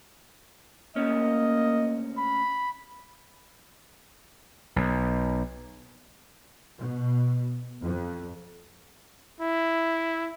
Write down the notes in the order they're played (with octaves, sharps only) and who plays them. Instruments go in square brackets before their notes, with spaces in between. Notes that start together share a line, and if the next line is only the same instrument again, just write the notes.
[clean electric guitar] D2 C#4 [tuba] A#3 [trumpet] D#5
[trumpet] B5
[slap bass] B1
[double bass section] B2
F2
[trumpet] E4